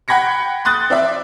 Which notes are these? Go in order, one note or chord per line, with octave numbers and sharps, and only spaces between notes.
F#5 G5 B5 G#6 A#6 C#7
C6 D#6 F#6 A6
C4 D5 E5